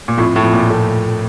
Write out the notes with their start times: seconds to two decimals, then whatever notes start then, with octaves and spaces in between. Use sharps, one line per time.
0.08 A#2
0.18 F2 A2
0.36 A2
0.44 F2
0.53 A#2
0.69 A2 A3